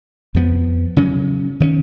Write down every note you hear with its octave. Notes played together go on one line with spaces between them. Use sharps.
F2 F3 B3
C#3 F#3 C#4
D#3 A#3 C#4